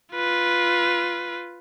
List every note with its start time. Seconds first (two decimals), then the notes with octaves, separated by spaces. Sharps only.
0.14 F4 B4